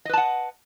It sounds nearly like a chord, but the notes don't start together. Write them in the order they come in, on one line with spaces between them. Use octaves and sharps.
D#5 B4 A5 F#5